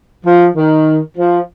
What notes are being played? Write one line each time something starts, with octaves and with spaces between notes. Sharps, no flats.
F3
D#3
F3